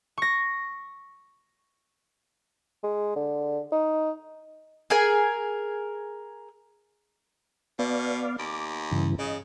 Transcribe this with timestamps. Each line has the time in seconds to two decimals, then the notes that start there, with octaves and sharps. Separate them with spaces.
0.18 C#6 A#6
2.83 G#3
3.16 D3
3.72 D#4
4.90 G#4 A#4 G#5
7.79 B2 B3 D5 F5
8.39 D#2 D6
8.91 G2 C#3 E3
9.19 C#3 D#5